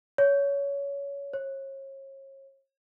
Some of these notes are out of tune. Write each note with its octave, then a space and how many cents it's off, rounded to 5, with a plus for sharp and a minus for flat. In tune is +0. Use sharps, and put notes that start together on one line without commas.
C#5 +20
C#5 -35